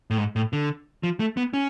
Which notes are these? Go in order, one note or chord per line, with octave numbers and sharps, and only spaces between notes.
A2
G#2
A2
D3
F3
A3
B3
C#4